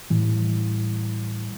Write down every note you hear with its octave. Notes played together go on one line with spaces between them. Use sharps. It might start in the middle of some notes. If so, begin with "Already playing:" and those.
A2 E3 G3